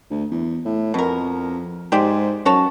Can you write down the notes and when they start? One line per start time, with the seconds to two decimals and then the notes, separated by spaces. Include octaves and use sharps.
0.10 D2
0.31 E2
0.65 A2
0.94 F2 B2 A#4
1.92 G#2 G4 C5 D5
2.45 F#2 F#4 C#5 A5